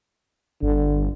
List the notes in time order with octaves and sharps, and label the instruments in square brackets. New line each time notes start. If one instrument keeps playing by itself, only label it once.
[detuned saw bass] G1 [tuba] D3